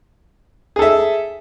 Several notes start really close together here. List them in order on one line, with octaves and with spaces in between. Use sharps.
G#4 A4 E5